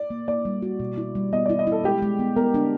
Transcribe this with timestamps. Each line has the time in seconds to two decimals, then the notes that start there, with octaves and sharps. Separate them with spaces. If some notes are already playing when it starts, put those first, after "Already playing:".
Already playing: D5
0.10 A#3
0.28 A#3 D5
0.45 G3
0.62 F#4
0.80 B2
0.98 E4
1.15 G3
1.33 B3 D#5
1.45 E4 D5
1.59 D#5
1.67 E4 A4
1.84 G#3 G4
2.02 G#3
2.19 B3
2.36 B3 A#4
2.54 D4